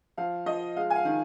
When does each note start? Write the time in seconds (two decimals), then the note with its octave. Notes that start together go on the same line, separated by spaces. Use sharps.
0.18 F3 F5
0.46 F3 D#5
0.76 G#3 F5
0.90 G#5
0.96 F5
1.05 D#3